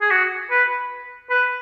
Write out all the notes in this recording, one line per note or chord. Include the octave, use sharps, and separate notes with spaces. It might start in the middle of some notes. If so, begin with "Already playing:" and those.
G#4
F#4
B4
B4